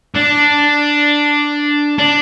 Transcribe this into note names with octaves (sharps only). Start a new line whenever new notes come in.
D4
D4